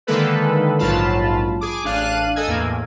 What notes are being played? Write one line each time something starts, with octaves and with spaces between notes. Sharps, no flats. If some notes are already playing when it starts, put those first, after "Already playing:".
D3 D#3 G#3 A#3 A4 B4
A#1 G#2 F#3 F4 A5 B5
G#4 D6
A1 D4 F5 F#6 D#7
A4 D#5 G#5 E6 G#6
E2 A2 A#3